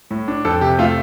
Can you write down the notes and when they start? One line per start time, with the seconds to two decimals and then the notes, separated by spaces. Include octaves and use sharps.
0.11 A2
0.28 D4
0.45 F2 A4
0.61 C3 G4
0.79 A3 F4